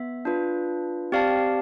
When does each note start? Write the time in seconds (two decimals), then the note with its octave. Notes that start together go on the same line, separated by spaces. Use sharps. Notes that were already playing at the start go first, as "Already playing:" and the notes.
Already playing: B3 E5
0.25 D4 F4 B4
1.12 C4 G4 D5 F5 A5